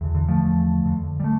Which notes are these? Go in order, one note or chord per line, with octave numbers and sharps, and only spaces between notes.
E2 D3
D3
F3 A3
E2 D3
F2 D3
G3
A3